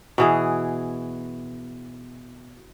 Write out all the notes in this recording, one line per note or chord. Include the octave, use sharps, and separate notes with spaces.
B2 E3 G#4